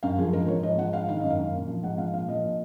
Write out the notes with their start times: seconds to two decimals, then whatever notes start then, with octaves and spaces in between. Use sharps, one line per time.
0.03 F#2 F5
0.18 F3 G#4
0.33 G#2 A#4
0.48 F3 C#5
0.63 G#2 D#5
0.78 F3 F#5
0.93 G#2 F5
1.08 D#3 F5
1.20 F#2 D#5
1.30 F5
1.39 F#2
1.53 A#2
1.68 F3
1.83 G#2 F#5
1.98 F3 F5
2.13 A#2 F5
2.29 F3 D#5
2.44 A#2